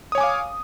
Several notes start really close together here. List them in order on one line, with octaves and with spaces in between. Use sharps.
D#6 C#5 G#5 D6 F5